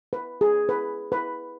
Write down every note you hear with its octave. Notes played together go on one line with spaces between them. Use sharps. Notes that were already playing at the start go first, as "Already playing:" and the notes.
B4
G#4
B4
B4